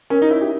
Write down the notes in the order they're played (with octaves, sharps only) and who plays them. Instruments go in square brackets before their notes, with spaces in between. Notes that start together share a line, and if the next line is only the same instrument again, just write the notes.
[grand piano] C#4 [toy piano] A#4
[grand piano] D#4
[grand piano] E4 [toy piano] C#5 E5
[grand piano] G4